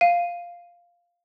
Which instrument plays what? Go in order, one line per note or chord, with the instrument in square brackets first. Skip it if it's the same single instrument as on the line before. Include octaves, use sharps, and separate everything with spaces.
[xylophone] F5 D#7